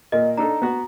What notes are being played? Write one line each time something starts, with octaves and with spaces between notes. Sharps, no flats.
A#2 A#3 D#5
D4 D#4 A4 A#5
B3 F#4